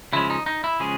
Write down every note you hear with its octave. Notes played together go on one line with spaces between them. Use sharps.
C#3 F3 G#3 C#4 E4
D#4
D#4
E4
C#3 F3 G#3 C#4 G#4